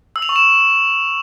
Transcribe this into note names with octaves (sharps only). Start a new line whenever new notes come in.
E6
F7
C#6
E7